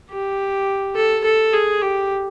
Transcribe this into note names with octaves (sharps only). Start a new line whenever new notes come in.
G4
A4
A4
G#4
G4